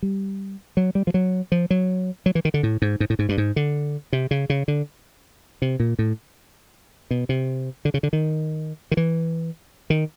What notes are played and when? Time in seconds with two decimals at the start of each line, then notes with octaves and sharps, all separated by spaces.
0.02 G3
0.77 F#3
0.95 G3
1.07 F3
1.14 F#3
1.52 F3
1.70 F#3
2.26 F#3
2.35 E3
2.45 D#3
2.54 D3
2.63 A2
2.82 G#2
3.00 G#2
3.10 A2
3.19 G#2
3.29 G2
3.38 G#2
3.56 D3
4.13 C3
4.31 C#3
4.50 C#3
4.68 D3
5.62 C3
5.80 A#2
5.99 A2
7.11 B2
7.29 C3
7.85 D3
7.94 C#3
8.03 D3
8.13 D#3
8.91 D#3
8.97 E3
9.90 D#3